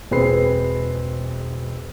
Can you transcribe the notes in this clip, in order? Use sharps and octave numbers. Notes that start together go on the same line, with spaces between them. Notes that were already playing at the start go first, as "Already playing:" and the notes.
E1 C4 G#4 B4 B5 C7